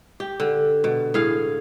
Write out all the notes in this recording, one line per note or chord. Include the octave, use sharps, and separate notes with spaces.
G4
D3
B2
A2 G#4 F5